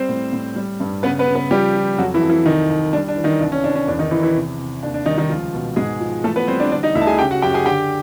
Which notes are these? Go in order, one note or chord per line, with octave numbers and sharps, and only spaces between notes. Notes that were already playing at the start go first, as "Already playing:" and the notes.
Already playing: G3 C4 C5
A2
A2
G3
G2
C#3 B3 B4
B3 B4
C#3
B3 B4
F3 G3 G4
F3
F2 F#3 F#4
E3 E4
F2
E3 E4
C2 D#3 D#4
C2
G3 D4
D4
E3
D#3 D#4
C2 D4
C#4
C2 D4
C#4
E2 D4
D#3 D#4
E2 E3 E4
E3 E4
C3
C3
D#2 D4
D4
D#3 G3 D#4
D#3 D#4
C#2 F3 F4
B2
G#2 G#3 G#4
F3
E3 A3 A4
B3 B4
G3 C4 C5
D4 D5
D3 D4 D5
D#4 D#5
D2 E4 E5
A5
G#4 G#5
C#3 G4 G5
F#4 F#5
F#2 G4 G5
G#4 G#5
D3 G4 G5